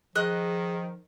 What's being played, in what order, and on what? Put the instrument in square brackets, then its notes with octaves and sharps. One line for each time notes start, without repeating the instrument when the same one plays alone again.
[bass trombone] D#3 [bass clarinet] F3 [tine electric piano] G#4 [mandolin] D#5 F#6